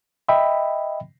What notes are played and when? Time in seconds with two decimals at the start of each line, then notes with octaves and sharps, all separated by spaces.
0.29 D#5 E5 G5 B5